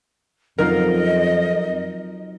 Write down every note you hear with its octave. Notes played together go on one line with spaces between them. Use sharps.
F2 F#3 D#4 F4 A#4 D#5